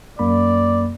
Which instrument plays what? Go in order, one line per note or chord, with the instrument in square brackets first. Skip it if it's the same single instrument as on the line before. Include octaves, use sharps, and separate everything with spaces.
[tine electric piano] F#2 A#3 B5 [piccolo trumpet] D5